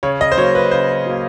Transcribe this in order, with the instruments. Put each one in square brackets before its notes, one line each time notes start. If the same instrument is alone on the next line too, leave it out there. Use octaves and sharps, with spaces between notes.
[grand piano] C#3 C#5
D#5
C5
F#3 C#5
A#3
B4
C#3 C5
F#3 A#3